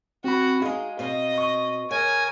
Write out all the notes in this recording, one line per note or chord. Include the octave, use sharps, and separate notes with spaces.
C4 C#4 F#4 B5
G#3 D#4 G#4 F5
B2 C4 D#5
C#6
C#3 A#4 G#5